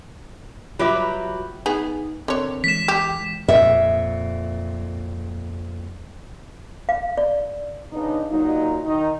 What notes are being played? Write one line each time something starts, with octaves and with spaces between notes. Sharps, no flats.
F#3 F4 G4 B4 E5 D6
B3 D#4 G#4
D3 C4 A#4 C#5
E3 G#3 B6 E7
G4
F2 A#2 E5
F5
D5
C#3 B3 D4 D#4
A#2 F#3 D#4
D#3 D#4